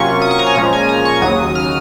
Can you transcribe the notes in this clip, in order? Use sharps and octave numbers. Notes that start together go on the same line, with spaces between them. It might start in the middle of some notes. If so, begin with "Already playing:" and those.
Already playing: C3 F#3 A#3 C#4 F4 C#6
D#6
C#6
A#5
G#5
A#2 F3 G#3 C#4 A#5
G#5
A#5
C#6
D#2 C#3 F#3 D#6
F6